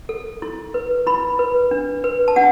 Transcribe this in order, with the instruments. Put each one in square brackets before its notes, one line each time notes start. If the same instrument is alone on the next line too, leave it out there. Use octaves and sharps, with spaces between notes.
[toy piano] A4
E4
B4
E4 B5
B4
D4
B4
A5
D4 F#5